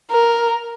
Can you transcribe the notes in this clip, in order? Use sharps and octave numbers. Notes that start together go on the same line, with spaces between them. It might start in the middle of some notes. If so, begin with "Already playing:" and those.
A#4